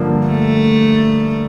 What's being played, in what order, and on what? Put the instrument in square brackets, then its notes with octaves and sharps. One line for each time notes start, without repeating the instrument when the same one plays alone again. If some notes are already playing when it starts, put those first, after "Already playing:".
Already playing: [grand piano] G2 D3 F3 A#3 D4
[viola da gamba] A3